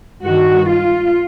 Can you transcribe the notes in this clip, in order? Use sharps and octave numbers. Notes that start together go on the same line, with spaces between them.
G2 D#3 F#4
F4